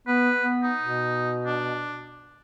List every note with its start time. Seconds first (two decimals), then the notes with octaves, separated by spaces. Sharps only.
0.07 B3 B4
0.42 B3
0.63 D#4
0.81 B2
1.46 D4